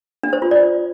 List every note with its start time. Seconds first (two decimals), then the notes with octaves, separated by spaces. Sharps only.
0.23 D4
0.33 C5
0.42 F4
0.51 D5